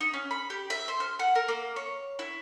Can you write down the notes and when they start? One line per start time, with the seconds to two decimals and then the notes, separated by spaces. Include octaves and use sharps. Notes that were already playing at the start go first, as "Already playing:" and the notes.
0.01 D#4
0.13 C#4
0.31 B5
0.50 G4
0.70 E5
0.88 C5
1.00 F6
1.19 F#5
1.35 A#4
1.48 A#3
1.76 C#5
2.19 E4